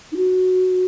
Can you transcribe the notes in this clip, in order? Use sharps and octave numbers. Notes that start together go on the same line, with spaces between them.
D#4
F#4